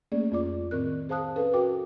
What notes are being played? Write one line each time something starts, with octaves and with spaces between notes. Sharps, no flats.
A3 A#3 C#4 G#4 D5
F2 F4 D5 D6
A2 D#3 C4 A#4 F#6
G#4 C5 F5 A5 D#6 F#6
C#4 A4 B4 F5
F#4 A4 A#4 G5 D6